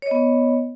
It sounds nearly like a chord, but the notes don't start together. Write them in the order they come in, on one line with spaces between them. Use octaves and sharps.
C#5 D#5 B3